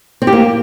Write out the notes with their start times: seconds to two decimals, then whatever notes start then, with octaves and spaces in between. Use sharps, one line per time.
0.22 C4
0.27 G4
0.33 A#3